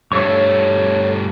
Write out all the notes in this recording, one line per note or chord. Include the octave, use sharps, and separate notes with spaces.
G2 A3 A4 C#5 C#6